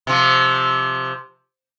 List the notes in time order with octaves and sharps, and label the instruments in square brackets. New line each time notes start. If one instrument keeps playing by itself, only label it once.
[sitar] C3 F3